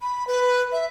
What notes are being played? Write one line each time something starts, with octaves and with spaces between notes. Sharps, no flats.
B5
B4
E5